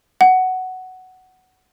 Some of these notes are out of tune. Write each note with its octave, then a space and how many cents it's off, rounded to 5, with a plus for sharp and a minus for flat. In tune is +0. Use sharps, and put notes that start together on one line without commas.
F#5 +5